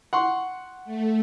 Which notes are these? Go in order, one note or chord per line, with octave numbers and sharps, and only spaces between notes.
F#5 C6 C#6
A3